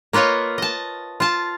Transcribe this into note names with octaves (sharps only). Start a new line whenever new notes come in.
A#3 F4 B4 C#5 D#5
D#5 A5
F4 A5